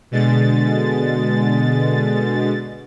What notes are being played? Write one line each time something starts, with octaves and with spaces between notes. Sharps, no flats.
B2 D3 G#3 A6